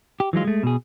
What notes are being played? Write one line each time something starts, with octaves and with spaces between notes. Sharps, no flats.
G4
E3 F#3 G#3 F4
G#3 A3
B2 G#4